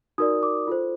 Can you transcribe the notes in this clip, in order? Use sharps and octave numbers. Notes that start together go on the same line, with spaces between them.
D#4 F#4 A#4 D5 D#6
D6
F4 A4 C5